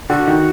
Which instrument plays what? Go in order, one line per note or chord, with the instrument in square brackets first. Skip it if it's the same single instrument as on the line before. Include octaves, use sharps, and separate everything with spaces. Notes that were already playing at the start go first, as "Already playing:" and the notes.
[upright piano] D3 [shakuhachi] F#4
[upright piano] D#3